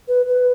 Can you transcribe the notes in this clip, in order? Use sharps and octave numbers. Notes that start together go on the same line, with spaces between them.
B4
B4